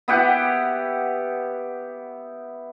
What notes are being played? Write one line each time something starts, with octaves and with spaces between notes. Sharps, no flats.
B3 E4 G4 F#5